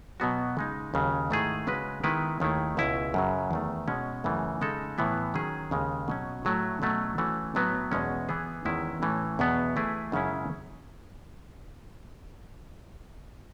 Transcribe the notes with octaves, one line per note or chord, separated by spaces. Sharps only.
B2 F#3 B3 F#4
C#3 G#3 D#4
D#2 C#3 F#3
G#2 D#3 A3 E4 G#4
C#3 G#3 C#4 F#4 B4
D#3 G#3 B3 E4 B4
D#2 D#3 A3 E4 G#4
C#2 B2 G#3 C#4 E4
F#2 C#3 F#3
E2 D#3 A3
B2 G#3 C#4
F#2 C#3 E3 A3
C#3 G#3 D#4 A4
A2 E3 B3 E4
D#3 F#3 C#4 G#4
D#2 C#3 G#3
B2 F#3 C#4
A2 F#3 A3 E4
B2 F#3 A3 C#4
E3 A3 C#4 F#4
A2 F#3 B3 F#4 B4
E2 B2 G#3 C#4
E3 B3 E4 G#4
E2 D#3 G#3 C#4 E4
A2 E3 A3 C#4
E2 B2 F#3 B3
E3 A3 E4 G#4 B4
F#2 C#3 G#3 C#4 E4